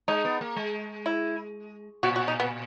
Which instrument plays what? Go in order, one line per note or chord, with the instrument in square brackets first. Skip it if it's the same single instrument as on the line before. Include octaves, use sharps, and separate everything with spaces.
[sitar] G#3 [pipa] D#4
[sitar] B3
A#3
G#3
[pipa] E4
[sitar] A#2 [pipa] F#4
[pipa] F#4
D#4
B3